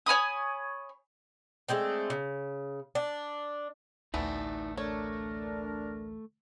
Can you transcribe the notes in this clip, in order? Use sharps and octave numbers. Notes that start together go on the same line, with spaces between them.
C#5 G#5 B5 D#6
G#3 A3 C4 D4
C#3
D4
A1 D2 E3 A3 B3 D#4 E4 D5
A3 D4 A#4 C#5